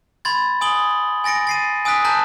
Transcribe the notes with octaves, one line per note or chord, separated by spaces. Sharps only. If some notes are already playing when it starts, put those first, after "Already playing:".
B5 C6 G#6 A6
G#5 D#6 F#7 G7
G#5 A6 A#6 C#7 D7
A6 C7 D#7
G#5 D#6 E6 F#6 B6
A5 A#5 F#6 G6 B6